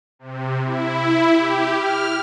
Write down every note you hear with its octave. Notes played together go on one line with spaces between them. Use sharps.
C3
E4
G4
F6